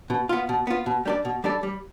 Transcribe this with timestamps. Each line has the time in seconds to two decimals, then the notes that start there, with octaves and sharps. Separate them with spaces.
0.10 B2
0.29 B3 F4
0.49 B2
0.67 B3 F4
0.86 B2
1.05 G3 D4 A4 D5
1.25 B2
1.44 G3 D4 A4 D5
1.63 G3